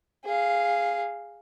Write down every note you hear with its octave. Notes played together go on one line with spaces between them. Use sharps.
G#4 F5